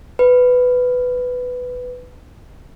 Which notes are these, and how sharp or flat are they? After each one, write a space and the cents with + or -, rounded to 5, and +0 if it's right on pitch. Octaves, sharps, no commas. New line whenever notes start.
B4 +10